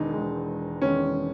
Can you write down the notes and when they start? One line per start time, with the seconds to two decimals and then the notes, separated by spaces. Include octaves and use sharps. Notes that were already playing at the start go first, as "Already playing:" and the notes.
Already playing: E1 E2 D#3 G#3 D#4
0.14 E1 E2 D#3 G#3
0.81 E1 E2 D#3 G#3 C#4